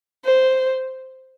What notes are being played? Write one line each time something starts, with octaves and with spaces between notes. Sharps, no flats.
C5